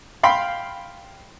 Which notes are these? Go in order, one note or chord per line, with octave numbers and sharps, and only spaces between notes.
F5 G5 B5 C6